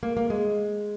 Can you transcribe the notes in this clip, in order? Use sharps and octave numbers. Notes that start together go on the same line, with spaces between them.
A#3
A#3
G#3